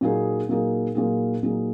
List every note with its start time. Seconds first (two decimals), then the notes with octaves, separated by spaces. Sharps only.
0.01 A#2 F#3 A#3 D#4 G#4
0.49 A#2 F#3 A#3 D#4 G#4
0.95 A#2 F#3 A#3 D#4 G#4
1.43 A#2 F#3 A#3 D#4 G#4